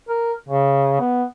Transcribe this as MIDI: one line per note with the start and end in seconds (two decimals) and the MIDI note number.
0.09 0.33 70
0.49 0.96 49
1.01 1.23 59